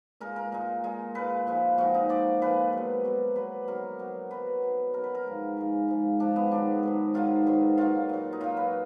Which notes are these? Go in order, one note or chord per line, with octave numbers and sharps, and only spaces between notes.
A#2 G#3 A#4
A#4
A#2 G#3
A#2 G#3
A#2 G#3 B4
A#2 F3 G#3
A#2 F3 G#3 F#4
D#4
A#2 F3 G#3 D5
A#2 F3 G#3 B4
B2 F#3
B2 F#3
B2 F#3 B4
B2 F#3 A#4
B2 F#3
B2 F#3 B4
B2 F#3
B2 F#3 A#4
B4
A#4
G#2 F3 G#3
G#2 F3 G#3
G#2 F3 G#3
G#2 F3 G#3 D4
B3
G#2 D#3 F#3 D4
G#2 D#3 F#3
G#2 D#3 F#3 F4
G#2 D#3 F#3
A#2 F#3 F4
A#2 F#3
D#4
A#2 F#3 F4
B4